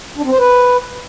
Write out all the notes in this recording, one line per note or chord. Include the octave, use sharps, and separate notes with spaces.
D4
C4
C5
B4